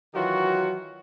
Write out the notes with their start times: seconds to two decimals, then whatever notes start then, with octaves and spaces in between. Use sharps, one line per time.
0.14 D#3 E3 F#3 F4 F#4